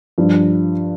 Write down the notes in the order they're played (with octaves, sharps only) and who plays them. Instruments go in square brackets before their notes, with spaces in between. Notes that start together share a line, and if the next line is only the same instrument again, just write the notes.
[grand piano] G2 F3